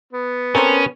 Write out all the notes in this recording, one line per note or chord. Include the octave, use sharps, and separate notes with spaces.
B3
C4 C#4 A4 A#4 C5